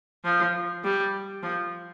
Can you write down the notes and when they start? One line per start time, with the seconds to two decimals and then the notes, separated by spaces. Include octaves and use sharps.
0.25 F3
0.84 G3
1.43 F3